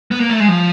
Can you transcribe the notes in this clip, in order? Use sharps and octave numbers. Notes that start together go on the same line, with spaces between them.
B3
A#3
A3
G#3
F3